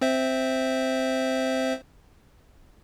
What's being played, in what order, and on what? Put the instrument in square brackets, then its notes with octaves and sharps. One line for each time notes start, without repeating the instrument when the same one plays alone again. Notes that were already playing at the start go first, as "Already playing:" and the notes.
[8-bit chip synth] C4 C5 E5